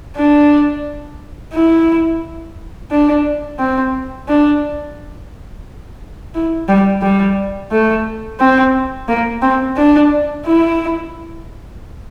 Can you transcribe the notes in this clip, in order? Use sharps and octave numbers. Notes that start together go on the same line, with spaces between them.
D4
E4
D4
C4
D4
E4
G3
G3
A3
C4
A#3
C4
D4
E4